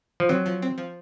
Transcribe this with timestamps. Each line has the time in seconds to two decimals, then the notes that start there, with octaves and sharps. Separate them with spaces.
0.20 F3
0.29 F#3 C4
0.46 F3
0.62 C4
0.78 F3